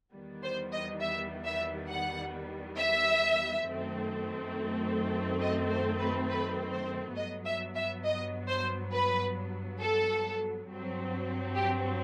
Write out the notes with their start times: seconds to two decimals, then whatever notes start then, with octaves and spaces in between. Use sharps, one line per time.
0.13 E2 D#3 G3 B3
0.43 C5
0.72 D#5
1.01 E5
1.45 E5
1.89 F#5
2.77 E5
3.65 F#2 D#3 A3 C4
5.40 D#5
5.70 C5
5.99 B4
6.29 B4
6.72 C5
7.16 G2 F#3 B3 D#5
7.45 E5
7.75 E5
8.04 D#5
8.48 C5
8.91 B4
9.79 A4
10.68 G2 F#3 C4
11.55 G4